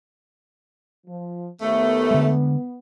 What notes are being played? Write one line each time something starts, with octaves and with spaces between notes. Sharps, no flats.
F3
D#2 A3 B3
D3 G#3